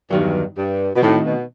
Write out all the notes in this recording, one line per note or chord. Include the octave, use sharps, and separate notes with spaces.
E2 G2 D#3 F#3
G2
B2
A2 D#3 A3 C4 D#4 F#4
B2